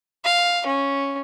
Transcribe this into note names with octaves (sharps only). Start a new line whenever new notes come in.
F5
C#4